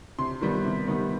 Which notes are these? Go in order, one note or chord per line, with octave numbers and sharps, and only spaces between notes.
C3 C6
D#3 G3 B3
C3
D#3 G3 B3